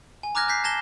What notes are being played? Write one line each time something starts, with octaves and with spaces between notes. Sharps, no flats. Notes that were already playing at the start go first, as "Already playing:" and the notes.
G#5
A#5 D6 F6 F#6 G#6 A#6
F#6 G6 B6 C7
A5 G#6 A#6 E7 G7